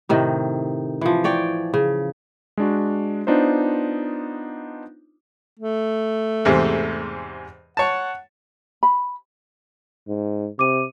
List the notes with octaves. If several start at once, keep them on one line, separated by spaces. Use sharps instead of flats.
A2 C3 D#3
E3 F3
C#5 D5 G5
C#3
G#3 D4 F#4
B3 D4 D#4 F4 C5
A3
E2 G#2 C3
C#5 F#5 A5
B5
G#2
C3 D6 D#7